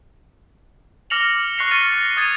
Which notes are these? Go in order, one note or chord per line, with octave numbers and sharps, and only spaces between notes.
D6 F6 A#6 C#7 F7 F#7
C#6 F#6 A#6 C7 C#7 F7
F6 A6 C#7 D#7
A#6
D#6 G#6 A6 D#7